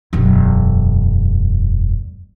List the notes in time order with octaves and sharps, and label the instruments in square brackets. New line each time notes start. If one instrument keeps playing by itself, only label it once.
[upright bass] E1 F#2